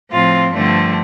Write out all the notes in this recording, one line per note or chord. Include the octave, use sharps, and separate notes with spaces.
A2 F3 C4 F4
G2 D3 F3 A3 C4